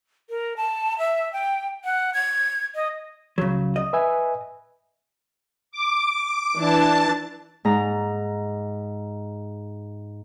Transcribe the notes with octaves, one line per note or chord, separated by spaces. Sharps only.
A#4
A5
E5
G5
F#5
G#6
D#5
C#2 C#3 F#3
D#5
B4 E5 G#5
D6
E3 D4 A5
G#2 A#5